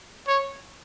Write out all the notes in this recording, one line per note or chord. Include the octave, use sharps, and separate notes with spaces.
C#5